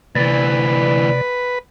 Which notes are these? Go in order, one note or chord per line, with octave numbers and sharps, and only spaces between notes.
D2 C3 E3 B4 D5